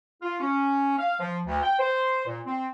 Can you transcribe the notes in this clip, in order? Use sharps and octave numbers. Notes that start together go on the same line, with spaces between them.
F4
C#4
F5
F3
D2
G5
C5
A#2
C4